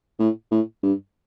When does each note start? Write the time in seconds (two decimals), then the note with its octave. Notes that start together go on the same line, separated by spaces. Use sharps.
0.19 A2
0.51 A2
0.83 G2